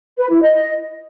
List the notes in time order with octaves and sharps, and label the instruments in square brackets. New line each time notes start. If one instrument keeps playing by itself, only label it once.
[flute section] B4
E4
D#5